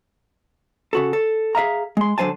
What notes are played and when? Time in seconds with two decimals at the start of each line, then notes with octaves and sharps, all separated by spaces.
0.93 C#3 F#4 A4
1.13 A4
1.55 G#4 E5 F5 A#5
1.97 G#3 C6
2.18 D3 F#3 C5 G#5 A5